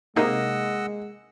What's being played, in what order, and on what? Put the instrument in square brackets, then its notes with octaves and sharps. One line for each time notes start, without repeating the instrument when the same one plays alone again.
[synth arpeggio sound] C3 D#4 G#4 [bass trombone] G#3 [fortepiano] A#3 [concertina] D#5 F#5 E6